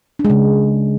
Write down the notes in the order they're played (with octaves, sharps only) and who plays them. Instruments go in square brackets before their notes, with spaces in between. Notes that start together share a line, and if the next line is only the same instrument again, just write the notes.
[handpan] D4
G#3
C#3